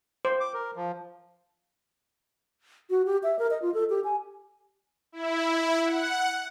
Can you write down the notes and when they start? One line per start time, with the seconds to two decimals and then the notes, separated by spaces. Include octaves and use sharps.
0.25 C5
0.40 D6
0.54 A#4
0.76 F3
2.90 F#4
3.06 G4
3.23 E5
3.39 A#4
3.51 D#5
3.62 F4
3.74 A4
3.90 G4
4.04 G#5
5.12 E4
5.84 F#5